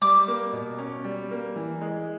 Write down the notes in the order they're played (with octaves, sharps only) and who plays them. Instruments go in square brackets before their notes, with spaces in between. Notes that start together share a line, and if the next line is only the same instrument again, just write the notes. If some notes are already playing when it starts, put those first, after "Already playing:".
[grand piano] G3 [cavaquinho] D6
[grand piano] A#3
B2
C#4
G3
A#3
E3
G#3